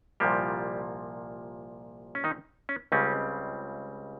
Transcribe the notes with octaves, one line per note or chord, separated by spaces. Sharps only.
C2 A#2 F3 G3 A#3 G4
C#4
D#3 D#4
C#4
C#2 C#3 G3 C4 C#4